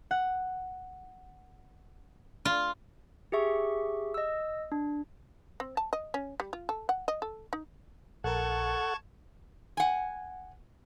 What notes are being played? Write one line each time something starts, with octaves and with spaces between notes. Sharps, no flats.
F#5
F4
G4 G#4 E5 C#6
D#5 E6
D4
C4
A5
D#5
C#4
G3
F4
A4
F#5
D#5
A4
D#4
A#1 A4 A#4 F#5 A5 C#6 G#6
F#5 G#5